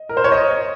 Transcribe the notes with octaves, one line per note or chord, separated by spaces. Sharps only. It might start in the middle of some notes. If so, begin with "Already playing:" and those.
Already playing: D#5
A#4
C5
C#5
D#5